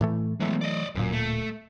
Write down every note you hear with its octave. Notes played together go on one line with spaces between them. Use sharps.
A2 E3 A3
E3 F#3 G#3 A3 B3
D5 D#5
D1 F#2 A#2
A3